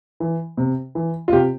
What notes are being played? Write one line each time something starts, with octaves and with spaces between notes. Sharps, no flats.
E3
C3
E3
F4
C3 G4